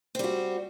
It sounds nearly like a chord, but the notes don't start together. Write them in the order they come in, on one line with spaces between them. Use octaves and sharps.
C4 G3 F#4